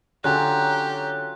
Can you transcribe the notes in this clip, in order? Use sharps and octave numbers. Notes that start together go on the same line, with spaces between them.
D3 F#3 C#4 F4 G4 F#6